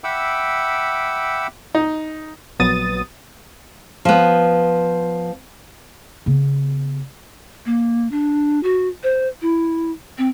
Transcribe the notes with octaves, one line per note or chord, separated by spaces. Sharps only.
E5 F#5 G5 B5 D6 E6
D#4
A#1 F#3 B3 D#6 A6 D#7
F3 B3
C#3 B3
A#3
D4
F#4
C5
E4
C4